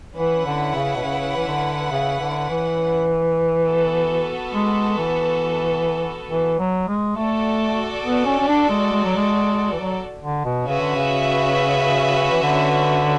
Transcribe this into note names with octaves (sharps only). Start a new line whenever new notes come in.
E3 C#4 E4 B4 F#5
D3
C#3
B2
C#3
E3
D3
C#3
D3
E3
B3 F#4 A4
G#3
E3
E3
F#3
G#3
A3 F#4 A4 D5
B3
C#4
C#4
D4
G#3
G#3
F#3
G#3
E3
F#3
D3
B2
C#3 C#4 F#4 B4 E5
D3
C#3
E3
D3